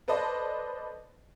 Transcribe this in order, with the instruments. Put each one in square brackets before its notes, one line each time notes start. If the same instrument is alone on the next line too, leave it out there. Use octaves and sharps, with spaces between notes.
[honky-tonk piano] A4 B4 C5 D5 D#5 A5